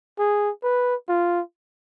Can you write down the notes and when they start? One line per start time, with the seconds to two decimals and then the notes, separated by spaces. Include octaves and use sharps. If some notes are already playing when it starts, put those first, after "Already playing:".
0.19 G#4
0.63 B4
1.09 F4